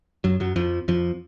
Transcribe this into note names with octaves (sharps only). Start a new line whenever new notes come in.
F#2 F#3
F#2 F#3
F2 F3
F2 F3